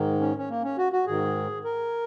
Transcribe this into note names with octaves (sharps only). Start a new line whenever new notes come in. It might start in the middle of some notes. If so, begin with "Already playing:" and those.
Already playing: G#2 D#3
C#4
C#4
A#3
C#4
F#4
F#4
G#2 D#3 G#4
A#4